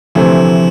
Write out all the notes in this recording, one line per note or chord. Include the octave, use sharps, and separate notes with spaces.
D2 C3 E3 F3 A3 C4